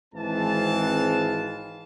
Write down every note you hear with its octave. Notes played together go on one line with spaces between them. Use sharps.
G#1 E3 G#3 C4 F5 A5